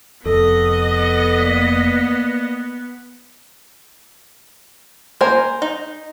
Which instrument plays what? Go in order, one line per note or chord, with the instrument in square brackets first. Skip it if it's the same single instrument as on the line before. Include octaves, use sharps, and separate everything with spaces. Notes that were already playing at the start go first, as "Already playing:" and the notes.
[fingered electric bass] F1 F2 [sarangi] B3 [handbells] A4 [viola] D#5
[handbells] A#3 D5 B6
[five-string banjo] A#4 G#5 [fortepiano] C5
[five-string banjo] D#4